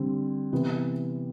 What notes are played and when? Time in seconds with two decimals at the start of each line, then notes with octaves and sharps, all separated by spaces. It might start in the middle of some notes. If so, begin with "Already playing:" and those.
Already playing: D3 G3 C4
0.52 C3 E3 B3